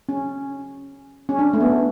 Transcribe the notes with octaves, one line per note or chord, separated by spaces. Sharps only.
C#4
C#4
D4
A3
B3